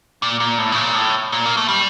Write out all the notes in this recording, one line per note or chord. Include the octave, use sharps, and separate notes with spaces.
A#2
A#2
A2
C#3
A#2
A2
A#2
A#3
A3
G3